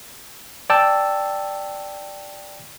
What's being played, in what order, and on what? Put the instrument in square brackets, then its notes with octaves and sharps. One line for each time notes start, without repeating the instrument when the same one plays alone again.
[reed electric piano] D5 G5 A5 E6